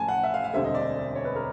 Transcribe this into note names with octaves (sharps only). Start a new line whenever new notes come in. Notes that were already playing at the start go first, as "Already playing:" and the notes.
Already playing: A1 A2 F3 G#5 A5
F#5
E5
F5
F5
E1 D2 D3 G3 C4 E5
D#5
D5
C#5
B4
A#4